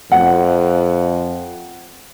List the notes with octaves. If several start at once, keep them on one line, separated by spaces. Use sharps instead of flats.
F2 F#5